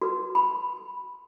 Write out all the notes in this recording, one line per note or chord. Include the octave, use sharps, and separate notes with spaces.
F#4 B4
B5